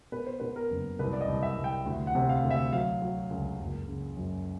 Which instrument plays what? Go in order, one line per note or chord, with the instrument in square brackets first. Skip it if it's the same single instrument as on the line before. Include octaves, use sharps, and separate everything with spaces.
[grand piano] B2 B4
C5
B2 B4
A#4
F#1
C2 B4
D5
D#5
C2
E5
C2
G5
D2
F#5
C3
F5
D2
E5
F#3 F5
F#3
C#2
F#1
C#3
F#2